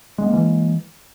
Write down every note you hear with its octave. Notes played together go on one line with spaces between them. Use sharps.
E3 G#3 A#3 B3